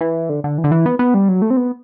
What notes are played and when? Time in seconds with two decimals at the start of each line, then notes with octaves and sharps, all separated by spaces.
0.01 E3
0.29 D3
0.44 D3
0.58 E3
0.64 D3
0.72 E3
0.86 B3
0.99 B3
1.14 G3
1.29 F#3
1.42 A3
1.50 C4
1.57 B3